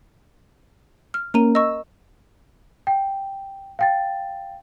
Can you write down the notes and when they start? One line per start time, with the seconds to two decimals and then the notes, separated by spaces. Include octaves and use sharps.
1.14 F6
1.34 A#3 C#4 A#4 A#5 D#7
1.55 D#5 C#6 E6
2.87 G5
3.79 F5 G5 A6